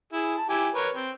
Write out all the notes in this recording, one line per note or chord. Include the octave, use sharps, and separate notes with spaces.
E4 G#4
A5
E4 G4 G#5
A#4 B4 C#5
C4